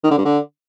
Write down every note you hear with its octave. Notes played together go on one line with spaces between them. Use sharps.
D#3
D3
G2
D3